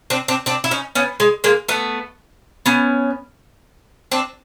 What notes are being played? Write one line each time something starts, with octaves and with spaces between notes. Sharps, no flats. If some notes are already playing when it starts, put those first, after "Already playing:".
C4 D4
C4 D4
C4 D4
E4
C#4 D#4
B3 C#4
G#3
G#3 A#3
A3 B3
B3 C#4
C4 D4